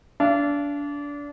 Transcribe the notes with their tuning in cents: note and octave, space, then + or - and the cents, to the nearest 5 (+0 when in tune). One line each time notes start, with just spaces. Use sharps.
D4 -25 F5 -40